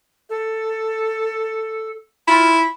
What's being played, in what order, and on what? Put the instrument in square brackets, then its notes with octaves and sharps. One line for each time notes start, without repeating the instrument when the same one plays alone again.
[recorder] A4
[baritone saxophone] E4 [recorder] F4